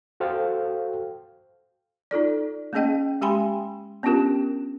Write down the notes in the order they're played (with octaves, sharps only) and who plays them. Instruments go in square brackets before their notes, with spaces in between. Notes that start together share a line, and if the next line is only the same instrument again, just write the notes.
[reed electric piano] F#4 A4 C5 F5 G5
[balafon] D#4 F4 A4 D5
A3 A#3 C#4 G#4 D#5 G5
G#3 G4 G5 G#5 B5 C6
B3 C#4 D4 F4 G4 A#4